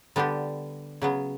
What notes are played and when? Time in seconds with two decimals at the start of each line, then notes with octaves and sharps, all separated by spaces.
0.16 D3 G3 B3 D4 G4
1.02 C#3 F#3 B3